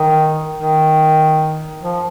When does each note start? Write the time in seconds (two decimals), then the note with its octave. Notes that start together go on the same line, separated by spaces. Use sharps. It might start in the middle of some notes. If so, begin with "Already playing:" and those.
Already playing: D#3
0.55 D#3
1.81 F3